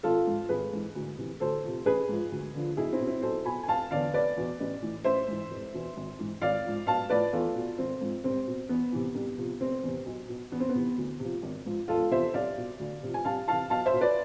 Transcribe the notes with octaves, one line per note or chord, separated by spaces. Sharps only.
G#1 F4 A4
G#2 F3
G#1 G#4 B4
G#2 E3
D2
C3 E3
D2 A4 C5
C3 F3
A1 G#4 B4
G#2 F3
D2
D3 F3
B1 E4 G#4
C4 E4
B2
C4 E4
B1 A4 C5
B2 G#5 B5
G#5
F1 F5 A5
E2 D3 D5 F5
F1 B4 D5
E2 B2
A1
A2 E3
A1 C5 E5
G#2 E3
F1
E2 B2
G#1
G#2 E3
G#1 D5 F5
G#2 F3
B1 F5 A5
A2 F3 B4 D5
E2 F4 A4
B2
G#1 C4
G#2 F3
C2 C4
B2
E2 B3
C3 E3
C2
C3 F3
F1 C4
E2 C3
B1
B2
E2 B3
C4
B3
C3 E3
D2
C3 F3
G#1
G#2 F3
E1 F4 A4
E2 C3 F3 C5 E5
C2 D5 F5
B2
D2
C3 F3
G#5
C2 F5 A5
C3 E3 F5 A5
B1 F5 A5
C5 E5
B2
B4 D5